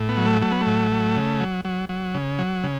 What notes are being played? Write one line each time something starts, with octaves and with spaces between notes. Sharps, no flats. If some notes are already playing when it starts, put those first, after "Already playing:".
Already playing: A2
B3
F#3
A3
F#3 A3
B3
A3
A2
F#3
C#3
F#3
F#3
F#3
C#3
F#3
C#3